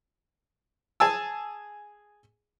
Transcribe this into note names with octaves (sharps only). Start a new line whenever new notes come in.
G#4 G#5 A5 E6